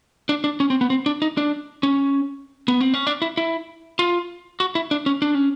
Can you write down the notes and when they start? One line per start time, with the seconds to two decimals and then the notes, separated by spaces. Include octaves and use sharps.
0.29 D4
0.44 D4
0.60 C#4
0.70 C4
0.81 B3
0.90 C4
1.06 D4
1.22 D#4
1.37 D4
1.83 C#4
2.68 B3
2.81 C4
2.94 C#4
3.07 D4
3.22 E4
3.37 E4
3.99 F4
4.60 F#4
4.75 E4
4.91 D4
5.06 C#4
5.22 D4
5.34 C#4